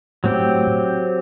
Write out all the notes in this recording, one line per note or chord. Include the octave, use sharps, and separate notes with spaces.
A2 F#3 C4 G4